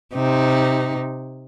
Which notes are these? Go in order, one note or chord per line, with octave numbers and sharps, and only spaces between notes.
C3 D#4